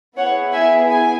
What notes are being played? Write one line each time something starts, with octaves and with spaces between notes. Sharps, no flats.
B3 E4 G#4 C#5 F#5
E5 G#5
G#5